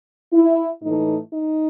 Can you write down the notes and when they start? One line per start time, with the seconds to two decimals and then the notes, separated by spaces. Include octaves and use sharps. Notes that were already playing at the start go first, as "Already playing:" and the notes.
0.33 E4
0.82 A2 E3 A3 D#4
1.32 D#4